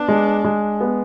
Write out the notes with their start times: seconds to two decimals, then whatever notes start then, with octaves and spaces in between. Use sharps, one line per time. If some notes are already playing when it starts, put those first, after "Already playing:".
Already playing: B3 D4
0.08 G#3
0.44 G#3
0.81 B3